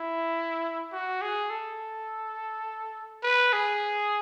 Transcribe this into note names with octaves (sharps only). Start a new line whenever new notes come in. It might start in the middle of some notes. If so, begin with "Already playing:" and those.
Already playing: E4
F#4
G#4
A4
B4
G#4